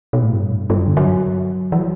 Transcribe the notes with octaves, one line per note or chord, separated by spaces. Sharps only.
B2
A2
G2
G2
F#2
D3
F#3
E3
F#3